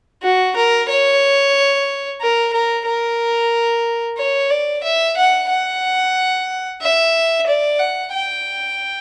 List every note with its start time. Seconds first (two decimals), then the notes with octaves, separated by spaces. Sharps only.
0.22 F#4
0.56 A#4
0.89 C#5
2.21 A#4
2.53 A#4
2.86 A#4
4.18 C#5
4.50 D5
4.84 E5
5.17 F#5
5.50 F#5
6.81 E5
7.47 D5
7.79 F#5
8.13 G5